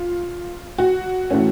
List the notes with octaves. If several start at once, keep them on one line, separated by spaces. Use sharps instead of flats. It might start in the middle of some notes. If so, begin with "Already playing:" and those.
Already playing: F4
F#4
A2 E3 A3 C#4